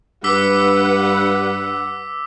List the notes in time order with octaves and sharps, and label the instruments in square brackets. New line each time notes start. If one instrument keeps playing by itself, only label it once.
[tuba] G2 [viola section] B4 F#5 [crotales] D6 E6 B6